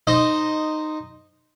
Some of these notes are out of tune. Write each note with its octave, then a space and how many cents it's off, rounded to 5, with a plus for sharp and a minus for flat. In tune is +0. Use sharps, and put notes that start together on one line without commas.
D#4 -10 C5 -5 D#5 -5